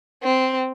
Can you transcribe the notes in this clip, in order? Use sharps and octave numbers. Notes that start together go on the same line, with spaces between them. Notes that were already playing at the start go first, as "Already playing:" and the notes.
C4